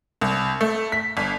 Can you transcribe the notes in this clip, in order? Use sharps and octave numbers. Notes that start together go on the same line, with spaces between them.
C2
A3
B6
G1